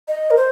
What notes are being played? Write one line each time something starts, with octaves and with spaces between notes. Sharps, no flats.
D#5
A#4
C5